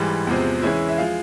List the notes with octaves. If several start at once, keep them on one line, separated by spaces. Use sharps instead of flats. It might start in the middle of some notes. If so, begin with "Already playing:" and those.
Already playing: G#2 E3 G3
E2 C3 F3 G#3 C4
E3 G#3 C#4 E4
E5
F3 G#3 F5